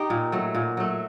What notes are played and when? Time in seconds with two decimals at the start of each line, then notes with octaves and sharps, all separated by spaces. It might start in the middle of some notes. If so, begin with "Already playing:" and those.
Already playing: D#4 G4
0.10 A#2
0.32 F#3 A3
0.55 A#2
0.77 F#3 A3